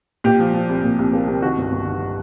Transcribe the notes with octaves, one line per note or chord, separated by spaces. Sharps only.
A#2 G4
F3
F3
C2
A#2
C2
A#3
C2
D#3 F#4
G1
G1
D#3